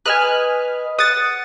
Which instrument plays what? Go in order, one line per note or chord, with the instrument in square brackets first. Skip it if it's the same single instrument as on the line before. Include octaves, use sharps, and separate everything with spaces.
[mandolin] B4 D#5 [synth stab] G#5 F6 F#6
[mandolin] F#5 [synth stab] D#6 A6